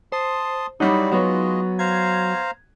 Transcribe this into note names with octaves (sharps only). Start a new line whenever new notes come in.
C5 A5 C6 D#6
F#3 G3 D#4 E4 F#4 D5
F#3 G#3 B3 F4 C#5 D#5
C5 F5 A#5 G#6